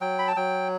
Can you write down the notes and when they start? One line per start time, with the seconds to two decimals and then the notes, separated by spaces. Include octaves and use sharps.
0.01 F#3 G5
0.19 B5
0.27 A5
0.36 F#3 G5